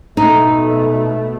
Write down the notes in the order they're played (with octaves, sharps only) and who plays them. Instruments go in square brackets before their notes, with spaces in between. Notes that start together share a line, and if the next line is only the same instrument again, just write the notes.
[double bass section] B2 A3 [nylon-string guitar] D#4